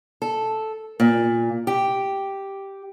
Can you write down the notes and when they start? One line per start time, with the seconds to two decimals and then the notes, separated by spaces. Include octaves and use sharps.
0.22 A4
1.00 A#2
1.67 G4